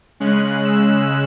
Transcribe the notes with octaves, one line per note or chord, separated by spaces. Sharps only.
C#3 G#3 C#4 F#6
E6